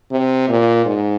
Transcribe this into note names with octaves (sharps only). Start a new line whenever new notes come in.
C3
A#2
G#2